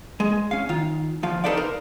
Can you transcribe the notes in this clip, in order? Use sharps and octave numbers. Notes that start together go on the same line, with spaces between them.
G#3
C#4 F5
D#3 F4
D2 F3 F5
D#4 A4 B4 C5 D5 F5
A#4